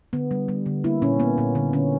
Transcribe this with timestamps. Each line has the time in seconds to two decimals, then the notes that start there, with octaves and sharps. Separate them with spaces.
0.13 D3 B3
0.31 G3
0.48 G3
0.66 D3
0.84 A#3 E4
1.02 A#2 C#4
1.20 A#3 B3
1.38 A#2 B3
1.55 D3 B3
1.73 D3 C#4